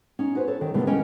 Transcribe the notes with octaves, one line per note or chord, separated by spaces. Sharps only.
C#4 D#4
F#4 B4 C5
A4 C#5
D#3
B2 D3 D#3 G3 A3
E2 C#4 A#4 D#5 G5 G#5